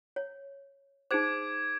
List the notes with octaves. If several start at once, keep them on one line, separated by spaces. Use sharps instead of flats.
C#5
D#4 G#4 C5 D6 G#6 D7